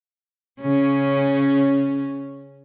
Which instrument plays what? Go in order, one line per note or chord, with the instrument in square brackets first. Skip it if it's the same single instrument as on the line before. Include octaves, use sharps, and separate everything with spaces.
[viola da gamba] C#3 C#4